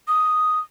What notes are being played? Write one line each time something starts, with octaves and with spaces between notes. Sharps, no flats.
D#6